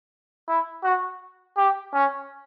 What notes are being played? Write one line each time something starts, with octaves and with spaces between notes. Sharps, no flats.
E4
F#4
G4
C#4